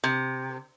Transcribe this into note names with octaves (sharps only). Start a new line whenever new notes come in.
C3